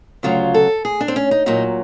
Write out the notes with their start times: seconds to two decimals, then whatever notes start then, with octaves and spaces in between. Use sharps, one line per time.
0.23 D2 C#3 F#3 F4
0.54 A4
0.85 G#4
1.01 D4
1.08 C4
1.16 C#4
1.31 D#4
1.46 A#2 F#3 D#4